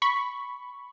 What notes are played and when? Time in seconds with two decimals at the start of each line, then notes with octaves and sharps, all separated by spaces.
0.02 B5 C#6